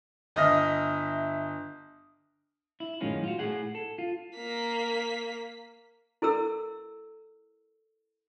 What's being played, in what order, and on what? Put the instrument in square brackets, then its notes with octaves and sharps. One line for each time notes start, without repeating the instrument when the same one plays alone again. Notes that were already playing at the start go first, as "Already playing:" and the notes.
[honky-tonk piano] G1 D#5 E5 D#6 F6 A#6
[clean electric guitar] E4
F#2 A2 D#3 G#3 C#4 F4
F4 F#4
A2 G#4 F#5
A4
F4
[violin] A#3 B6
[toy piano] E4 A4 A#4 E6